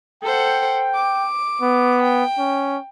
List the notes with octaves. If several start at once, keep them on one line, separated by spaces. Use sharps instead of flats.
A4 C5 F#5 G5
D6
B3
G5
C#4